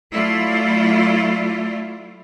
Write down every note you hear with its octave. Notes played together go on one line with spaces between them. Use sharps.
F#3 A3 E4 F4 D5